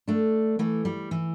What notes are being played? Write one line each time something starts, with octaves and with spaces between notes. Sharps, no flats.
A3 D4
E3 A3
G3
E3